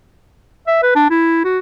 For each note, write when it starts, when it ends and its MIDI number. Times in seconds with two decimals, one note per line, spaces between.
0.67 0.82 76
0.83 0.96 71
0.96 1.10 62
1.10 1.44 64
1.44 1.59 66